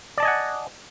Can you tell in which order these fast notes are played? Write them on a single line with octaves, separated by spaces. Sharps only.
D5 A5 D#5 G#5 F#5